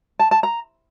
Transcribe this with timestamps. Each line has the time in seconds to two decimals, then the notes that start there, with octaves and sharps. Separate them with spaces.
0.19 A5
0.31 A5
0.43 A#5